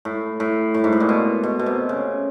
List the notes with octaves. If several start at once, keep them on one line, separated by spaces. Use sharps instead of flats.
A2
A2
A2
G#2
A2
A#2
B2
B2
B2
C3
C#3